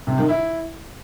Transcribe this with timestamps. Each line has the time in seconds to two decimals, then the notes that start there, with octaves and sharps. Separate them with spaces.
0.07 C3
0.18 D#3
0.29 E4